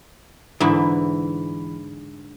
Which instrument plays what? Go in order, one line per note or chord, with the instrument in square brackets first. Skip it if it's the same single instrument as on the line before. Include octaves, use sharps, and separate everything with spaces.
[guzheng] G#2 D3 E4 [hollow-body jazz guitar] E3